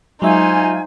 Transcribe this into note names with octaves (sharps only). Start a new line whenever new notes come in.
F#3 G#3 D#4 F4 C5 E5 G#5